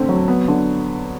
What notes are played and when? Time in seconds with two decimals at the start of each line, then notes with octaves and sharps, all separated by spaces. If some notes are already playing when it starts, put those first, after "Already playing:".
Already playing: D3 A3 C4
0.09 F#3
0.28 B3
0.48 D3